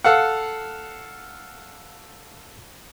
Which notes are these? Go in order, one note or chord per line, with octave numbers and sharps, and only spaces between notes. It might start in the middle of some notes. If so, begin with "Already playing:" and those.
A4 F5 F#5